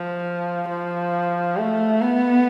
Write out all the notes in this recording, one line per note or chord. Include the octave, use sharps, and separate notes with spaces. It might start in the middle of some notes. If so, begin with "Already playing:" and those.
Already playing: F3
F3
A3
B3